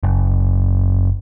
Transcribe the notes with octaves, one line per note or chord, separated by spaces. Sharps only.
F#1